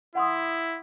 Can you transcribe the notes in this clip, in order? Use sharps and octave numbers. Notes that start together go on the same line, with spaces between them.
E4 F#5 C6 D#6